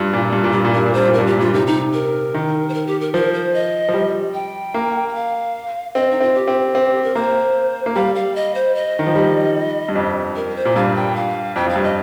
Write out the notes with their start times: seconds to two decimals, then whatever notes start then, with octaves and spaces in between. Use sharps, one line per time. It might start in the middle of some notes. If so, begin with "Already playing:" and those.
Already playing: G2 F4
0.13 A#2
0.33 G2
0.44 A#2
0.53 G2 G4
0.65 A#2
0.73 G2 A#4
0.86 A#2
0.94 G2 C5
1.08 A#2
1.14 A#4
1.19 G2
1.27 A#2 G4
1.39 G2 F4
1.54 C3 D#4
1.67 D#4
1.94 A#4
2.34 D#3
2.69 C5
2.74 A#4
2.87 G4
3.01 A#4
3.14 F3 A#4
3.34 C5
3.54 D#5
3.89 F3
3.94 G3
4.34 G5
4.74 A#3
5.09 G5
5.15 F5
5.95 C4 D#5
6.11 D#4
6.20 C4 F4
6.34 G4
6.48 C4
6.75 C4
7.03 A#4
7.15 A#3 C5
7.86 A#3
7.95 G3 F5
8.15 F5
8.36 D#5
8.55 C5
8.75 D#5
8.99 D#3
9.07 F3
9.16 G3
9.89 G2
9.95 F2
10.36 A#4
10.56 C5
10.65 A#2
10.76 G2 F5
10.96 G5
11.16 F5
11.56 F2 G5
11.66 F2
11.69 F5
11.76 G2
11.83 D#5